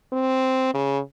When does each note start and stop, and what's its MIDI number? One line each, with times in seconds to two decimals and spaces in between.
0.13 0.70 60
0.74 0.99 49